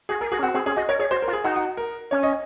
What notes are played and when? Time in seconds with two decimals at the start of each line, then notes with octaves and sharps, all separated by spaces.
0.09 F#4 G#4
0.21 G#4 A#4
0.32 F#4 G#4
0.39 C#4
0.43 C4 F#4
0.54 C4 G#4
0.66 C#4 G#4
0.76 F#4 D#5
0.89 A#4 C#5
0.99 G#4 C#5
1.11 F#4 C5
1.22 A#4
1.28 F4
1.33 G#4
1.44 D#4 F#4
1.56 F#4
1.77 A#4
2.11 C#4 C#5
2.23 D#5